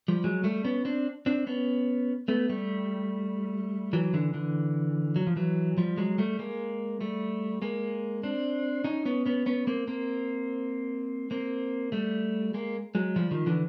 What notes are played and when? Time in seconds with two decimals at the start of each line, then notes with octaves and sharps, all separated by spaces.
0.08 F3 G3
0.24 F#3 G#3
0.44 G3 A3
0.64 B3 C#4
0.85 C4 D4
1.26 C4 D4
1.47 B3 C#4
2.28 A3 B3
2.49 G3 A3
3.93 E3 F#3
4.14 D3 E3
4.34 D3 E3
5.16 F#3
5.27 F3
5.36 E3 F#3
5.77 F3 G3
5.97 F#3 G#3
6.18 G3 A3
6.39 G#3 A#3
7.01 G3 A3
7.62 G#3 A#3
8.23 C4 D4
8.84 C#4 D#4
9.05 B3 C#4
9.26 B3 C#4
9.46 B3 C#4
9.67 A#3 C4
9.88 A#3 C4
11.31 A#3 C4
11.92 G3 A3
12.54 G#3 A#3
12.95 F#3 G#3
13.16 F3 G3
13.31 D#3 F3
13.46 D3 E3